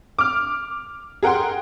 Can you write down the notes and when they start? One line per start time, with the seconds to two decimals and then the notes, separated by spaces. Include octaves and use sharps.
0.19 D6 F6
1.23 G#4 A#4 F#5 G5 C6